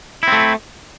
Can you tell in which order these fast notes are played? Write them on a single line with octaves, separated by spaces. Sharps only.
E4 C4 A3